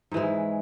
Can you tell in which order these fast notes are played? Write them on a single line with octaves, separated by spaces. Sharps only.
G#2 E3 G#3